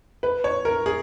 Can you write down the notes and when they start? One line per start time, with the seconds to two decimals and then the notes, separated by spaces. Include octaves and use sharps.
0.23 B4
0.44 C#5
0.65 A#4
0.86 G#4